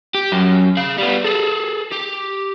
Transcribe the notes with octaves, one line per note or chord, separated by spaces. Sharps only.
G4
F#2
G#4 F5
G3 B3
G#4 A4
G4